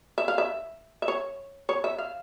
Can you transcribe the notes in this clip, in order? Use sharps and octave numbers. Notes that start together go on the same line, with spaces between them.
E5
F5
E5
E5
C#5
C#5
E5
F5